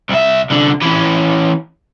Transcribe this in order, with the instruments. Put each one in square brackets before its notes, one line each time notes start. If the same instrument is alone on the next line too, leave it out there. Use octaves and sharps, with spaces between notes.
[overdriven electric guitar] C2 E5
C2 D3
E3 C#4